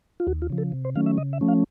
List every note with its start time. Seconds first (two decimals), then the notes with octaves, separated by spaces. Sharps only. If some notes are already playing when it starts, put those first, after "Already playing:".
0.20 F4
0.27 D#2 F#4
0.42 F4
0.50 C#3 F3
0.58 A4
0.72 C3
0.85 C5
0.95 D#3 F#3 A3 C#4 F5
1.06 E5
1.18 C#3 D#5
1.33 E5
1.41 F3 A3 C#4
1.48 F5